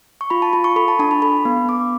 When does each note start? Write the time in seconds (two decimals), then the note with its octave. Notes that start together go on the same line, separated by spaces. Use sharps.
0.21 C#6
0.30 F4 B5
0.42 A5
0.53 F4 B5
0.64 C#6
0.76 A4 B5
0.88 A5
0.99 D4 A5
1.11 B5
1.22 A4 B5
1.45 B3
1.68 B3 D6